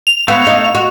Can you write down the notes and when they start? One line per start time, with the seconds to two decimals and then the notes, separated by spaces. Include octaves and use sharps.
0.07 F7
0.28 A3 B3 F#4 C#5 F5
0.47 D#4
0.75 F#4